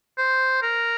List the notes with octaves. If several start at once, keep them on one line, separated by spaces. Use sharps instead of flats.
C5
A#4